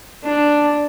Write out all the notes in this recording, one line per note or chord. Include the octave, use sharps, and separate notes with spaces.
D4